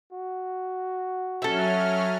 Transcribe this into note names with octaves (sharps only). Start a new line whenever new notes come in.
F#4
F#3 C#4 A4 E5 F6